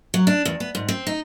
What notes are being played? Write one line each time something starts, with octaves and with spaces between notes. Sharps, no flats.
F#3
D4
E2
B3
G#2
C4
D#4